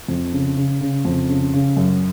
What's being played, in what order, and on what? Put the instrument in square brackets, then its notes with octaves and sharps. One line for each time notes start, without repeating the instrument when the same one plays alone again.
[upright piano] F2
C#3
C#3
C#3
F2
C#3
C#3
F#2